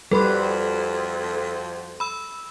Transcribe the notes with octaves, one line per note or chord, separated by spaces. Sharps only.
F2 G3 F#4 A4 B4 C6
B5 E6